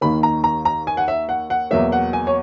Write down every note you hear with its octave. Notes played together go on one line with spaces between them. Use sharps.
D#2 D#3 A#3 B5
A#5
A#5
A#5
G#5
F#5
E5
F#5
F#5
E2 B2 F#3 A#3 E5
F#5
G#5
C#5